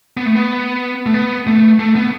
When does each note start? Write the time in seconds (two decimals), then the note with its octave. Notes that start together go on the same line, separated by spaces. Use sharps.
0.17 B3
0.26 A3
0.35 B3
1.06 A3
1.14 B3
1.47 A3
1.79 A3
1.96 B3